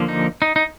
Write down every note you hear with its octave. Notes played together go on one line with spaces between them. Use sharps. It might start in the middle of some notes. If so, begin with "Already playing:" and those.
Already playing: D3 F3 A#3
D#4
D#4
D#4